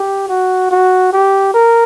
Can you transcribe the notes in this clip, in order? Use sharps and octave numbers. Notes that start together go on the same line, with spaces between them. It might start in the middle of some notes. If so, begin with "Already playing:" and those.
Already playing: G4
F#4
F#4
G4
A#4